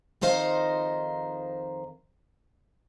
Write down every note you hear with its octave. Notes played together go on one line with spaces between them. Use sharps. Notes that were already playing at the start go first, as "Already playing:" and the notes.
F2 D#3 D#4 C5 F5 A#5